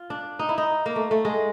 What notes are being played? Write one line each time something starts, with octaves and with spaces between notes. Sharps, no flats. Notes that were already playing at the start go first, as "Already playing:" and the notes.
Already playing: F4
D4
D#4
E4
D#4
A#3
A3
A3
G#3